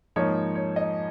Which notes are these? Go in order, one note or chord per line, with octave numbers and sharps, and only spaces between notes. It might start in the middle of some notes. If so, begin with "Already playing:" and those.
G#2 F3 A#3 D#4 C#5
C#5
D#5